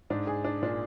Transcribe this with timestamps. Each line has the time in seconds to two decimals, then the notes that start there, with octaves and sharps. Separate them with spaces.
0.10 G#2 D4
0.27 G#4
0.45 D4
0.63 A#2 D4